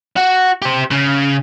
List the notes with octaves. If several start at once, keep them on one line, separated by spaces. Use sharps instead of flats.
F#4
G4 C5
C#3